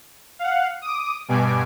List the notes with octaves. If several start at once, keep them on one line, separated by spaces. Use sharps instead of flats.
F5 F#5
D6 D#6
G2 B2 G#5 D6